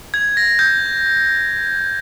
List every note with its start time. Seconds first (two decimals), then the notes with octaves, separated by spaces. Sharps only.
0.14 G#6
0.37 A#6
0.59 G6